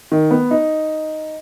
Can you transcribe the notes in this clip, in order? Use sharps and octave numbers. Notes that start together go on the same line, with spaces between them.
D#3
B3
D#4